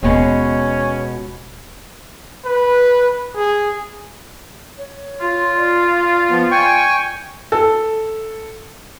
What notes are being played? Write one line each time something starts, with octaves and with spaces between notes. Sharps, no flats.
D#1 B2 G#3 C#4
B4
G#4
C#5
F4
D5
F3 B3
G5 G#5 C#6
A4